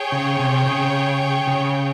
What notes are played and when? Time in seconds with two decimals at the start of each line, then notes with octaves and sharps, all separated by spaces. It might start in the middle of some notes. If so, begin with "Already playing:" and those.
Already playing: G#4 C#5 G5
0.12 C#3
0.39 C3
0.66 C#3
1.47 C#3